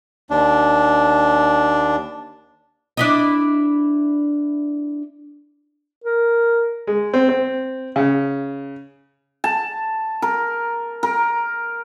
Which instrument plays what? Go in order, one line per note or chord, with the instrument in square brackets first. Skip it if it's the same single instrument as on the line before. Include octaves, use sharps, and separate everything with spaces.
[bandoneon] D#2 D4
[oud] D4 E4 D#5
[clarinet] A#4
[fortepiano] G#3
C4
C4
C#3
[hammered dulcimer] A5
A#4
A#4